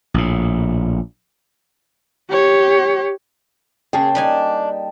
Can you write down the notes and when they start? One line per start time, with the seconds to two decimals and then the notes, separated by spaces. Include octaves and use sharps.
0.14 A#1 A2
2.30 G4 C#5
3.93 C#3 A#3 G#4 G5 A5
4.15 G3 D4 D#4 G#5